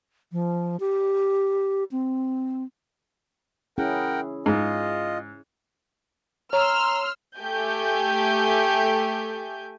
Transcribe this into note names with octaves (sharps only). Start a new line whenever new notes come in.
F3
G4
C4
C#4 E4 G#4 A#4 F#5 G5
G#2 F4 D#5
C#5 A#5 C6 E6 F6
A3 G4 G#5 G6